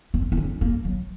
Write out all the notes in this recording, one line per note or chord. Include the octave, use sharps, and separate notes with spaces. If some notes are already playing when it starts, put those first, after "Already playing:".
C4
D#4
C#4
A#3
F#3